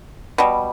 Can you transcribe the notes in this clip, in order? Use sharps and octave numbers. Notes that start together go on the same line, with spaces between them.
B2 G3